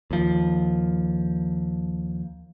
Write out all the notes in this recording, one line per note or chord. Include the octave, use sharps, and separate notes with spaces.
D#2 F3